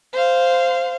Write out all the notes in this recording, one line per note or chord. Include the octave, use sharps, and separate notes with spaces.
C5 F5